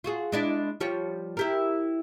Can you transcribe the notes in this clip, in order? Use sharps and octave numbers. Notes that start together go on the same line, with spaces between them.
F4 F#4 G#4
G#3 D4 E4
F3 G3 C#5
E4 G4 A#4